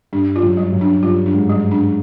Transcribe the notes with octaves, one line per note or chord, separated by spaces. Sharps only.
G2 D4
F4
F#2
G3
F#2
D4
G2 F4
D4
G#2
G3
D4